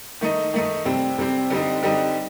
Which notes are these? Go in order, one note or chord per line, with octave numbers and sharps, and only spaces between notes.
D#3 A3 D#4
D#3 A3 D#4
C3 G3 C4
C3 G3 C4
D3 G3 C4 D#4
D3 G3 C4 D#4